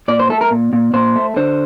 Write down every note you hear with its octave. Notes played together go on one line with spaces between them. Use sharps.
A#2 D5
C5
A3 A4
A#4
A#2
A#2
A#2 C5
A3
D3 C5